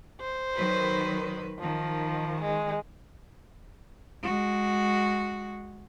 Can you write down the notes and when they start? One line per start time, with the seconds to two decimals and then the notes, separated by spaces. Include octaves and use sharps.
0.21 C5
0.54 D#3 F#3 B4
1.60 D#3 F3
2.41 G#3
4.24 G#3 F#4